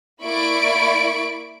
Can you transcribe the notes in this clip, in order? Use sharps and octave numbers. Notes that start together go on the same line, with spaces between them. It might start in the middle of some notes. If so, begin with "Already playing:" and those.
A#3 E4 D5 B5 C#6 D7